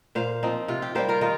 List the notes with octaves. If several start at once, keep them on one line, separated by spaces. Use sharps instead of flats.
A#2 C5 F5
F3 C4 D#4
C3 F4
G4
G3 A#3 G4 C5
F4 A#4
D#3 F4 A#4